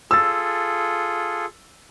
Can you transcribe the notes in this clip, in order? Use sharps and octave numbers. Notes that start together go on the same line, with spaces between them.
F4 G#4 A4 E6 A6